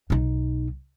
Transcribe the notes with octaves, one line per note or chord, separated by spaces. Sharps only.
B1 D#4